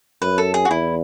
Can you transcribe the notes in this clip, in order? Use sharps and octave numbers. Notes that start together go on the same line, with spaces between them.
F#2 B4
A4
G#4
F#4
E2 E4